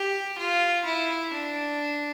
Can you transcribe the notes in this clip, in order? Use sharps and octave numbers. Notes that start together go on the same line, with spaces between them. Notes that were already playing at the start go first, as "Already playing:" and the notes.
Already playing: G4
F4
E4
D4